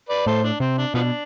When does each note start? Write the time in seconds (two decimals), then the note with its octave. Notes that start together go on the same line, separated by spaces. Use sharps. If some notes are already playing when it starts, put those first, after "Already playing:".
0.09 B4 D5
0.26 A2 A4 C5
0.43 D4
0.60 C3 C4
0.78 D4
0.94 B2 F3 B3 D4